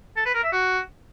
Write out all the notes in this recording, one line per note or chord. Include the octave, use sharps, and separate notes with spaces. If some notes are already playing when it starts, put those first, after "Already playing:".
A4
B4
A#4
E5
F#4